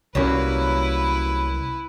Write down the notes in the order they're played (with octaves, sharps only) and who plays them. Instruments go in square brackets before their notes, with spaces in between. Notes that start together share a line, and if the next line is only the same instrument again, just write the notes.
[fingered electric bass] C2 E3 C#4 [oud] F#3 G3 A#3 [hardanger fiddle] E4 B4